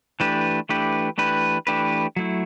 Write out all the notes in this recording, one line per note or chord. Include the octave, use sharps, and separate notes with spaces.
E3 A3 D4 G4 B4
E3 A3 D4 G4 B4
E3 A3 D4 G4 B4
E3 A3 D4 G4 B4
F#3 A3 E4